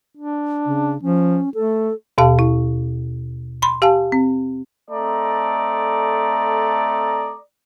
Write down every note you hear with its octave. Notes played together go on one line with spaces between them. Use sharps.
D4
C#3
F3 C#4
A3 A4
D#2 B2 G4 F5 A5
E4
B5 C6
G4 F5 G#5 A5
C4
A3 C4 A4 D5 D#5 A#5